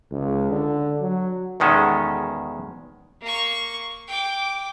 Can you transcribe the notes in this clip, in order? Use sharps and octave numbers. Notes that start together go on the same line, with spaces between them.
C#2
D3
F#3
E2 B2 D#3 G#3 C#4 A4
A#3 C#6
G5 D6